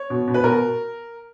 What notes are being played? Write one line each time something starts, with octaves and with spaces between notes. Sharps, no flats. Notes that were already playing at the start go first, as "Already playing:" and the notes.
Already playing: C#5
B2
B2
B4
B2 A#4